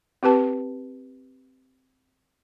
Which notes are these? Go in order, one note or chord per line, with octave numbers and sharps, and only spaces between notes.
C4 G4 B4 A5